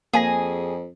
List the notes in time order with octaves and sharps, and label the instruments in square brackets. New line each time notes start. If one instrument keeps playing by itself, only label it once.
[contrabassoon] F2 [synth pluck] A#3 G#5 A#6 [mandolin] G#4